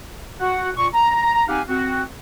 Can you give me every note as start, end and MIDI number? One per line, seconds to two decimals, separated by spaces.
0.41 0.70 66
0.41 0.70 78
0.76 0.87 46
0.76 0.87 85
0.94 1.44 82
1.48 1.61 60
1.48 1.61 63
1.48 1.61 67
1.48 1.61 77
1.48 1.61 78
1.48 1.61 80
1.69 2.02 60
1.69 2.02 66